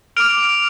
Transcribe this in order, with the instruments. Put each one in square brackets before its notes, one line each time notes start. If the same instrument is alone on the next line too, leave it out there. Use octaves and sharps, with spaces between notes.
[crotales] D6 F6 D7 F7